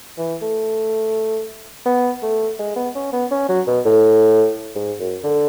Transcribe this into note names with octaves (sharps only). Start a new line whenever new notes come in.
E3
A3
B3
A3
G#3
B3
C#4
B3
C#4
F#3
B2
A2
G#2
F#2
D3